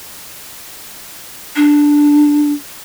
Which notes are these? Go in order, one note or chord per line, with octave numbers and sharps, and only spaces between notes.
D4